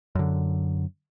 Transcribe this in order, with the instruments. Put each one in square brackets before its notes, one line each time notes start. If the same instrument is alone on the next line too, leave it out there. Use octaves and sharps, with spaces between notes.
[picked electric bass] F#2 D3